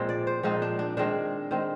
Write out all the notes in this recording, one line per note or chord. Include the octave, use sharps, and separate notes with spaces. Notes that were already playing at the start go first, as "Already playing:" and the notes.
Already playing: A#2 F3 G#3 C4
D5
C5
A#2 F3 G#3 C4 D#4
D4
D4
D#3 G#3 C4 D4
D#3 G#3 C4